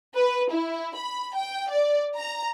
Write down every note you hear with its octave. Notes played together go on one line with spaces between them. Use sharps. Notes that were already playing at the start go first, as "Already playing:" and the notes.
B4
E4
B5
G5
D5
A#5